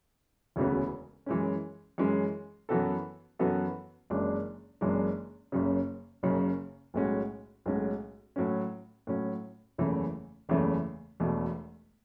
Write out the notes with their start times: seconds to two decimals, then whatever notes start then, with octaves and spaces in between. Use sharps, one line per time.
0.56 E1 D2 C#3 E3 B3
1.26 F#2 E3 G#3 C#4
1.98 F#2 E3 G#3 C#4
2.69 F#2 E3 B3 F#4 A4
3.39 F#2 E3 B3 F#4 A4
4.10 F#1 F#2 E3 G#3 D4
4.81 F#1 F#2 E3 G#3 D4
5.52 F#1 F#2 C#3
6.23 F#1 F#2 C#3
6.94 B1 A2 G#3 C#4 F#4
7.66 B1 A2 G#3 C#4 F#4
8.36 A2 F#3 C#4
9.07 A2 F#3 C#4
9.78 F#1 E2 C#3 E3 A3
10.49 F#1 E2 C#3 E3 A3
11.20 E1 E2 B2 A3